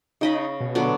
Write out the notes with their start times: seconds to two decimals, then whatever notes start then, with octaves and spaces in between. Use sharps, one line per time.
0.21 C#3 D#4 D#5 B5
0.60 B2
0.75 D3 F#3 B3